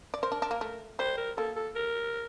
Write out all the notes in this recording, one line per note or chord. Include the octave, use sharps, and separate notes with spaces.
D5
A#4 C5
D4
D4
A#3
A3
G3 C5
A#4
A#3 A4
A4
A#4